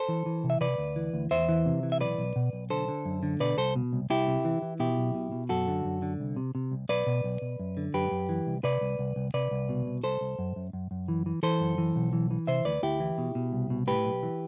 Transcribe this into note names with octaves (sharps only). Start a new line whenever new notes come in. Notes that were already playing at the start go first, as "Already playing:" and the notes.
Already playing: A4 C5
E3
E3
C3
E5
C3 B4 D5
D2
E3
D2
E2 C5 E5
E3
C3
E3
E5
B1 B4 D5
B1
B2
B1
D3 A4 C5
D3
F#2
D3
B2 B4 D5
C2 A4 C5
B2
C2
C2 E4 G4
C3
E3
E3
B2 E4 G4
B1
B2
B2
F#2 F#4 A4
D3
F#2
D3
C2
C3
C3
C2
B1 B4 D5
B2
B1
B2
F#2
D3
F#2 G4 B4
F#2
E3
C2
C3 B4 D5
C2
C2
C2
C3 B4 D5
C2
B2
C2
C2 A4 C5
C2
F#2
F#2
F#2
F#2
E3
E3
E3 A4 C5
F#2
E3
B1
E3
E3
C3 C5 E5
D2 B4 D5
D2 E4 G4
E3
B2
B2
C2
B2
A2 G4 B4
B1
E3